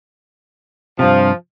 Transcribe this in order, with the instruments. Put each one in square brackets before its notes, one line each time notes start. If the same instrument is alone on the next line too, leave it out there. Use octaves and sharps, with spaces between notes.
[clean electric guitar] G2 C3 [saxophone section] F3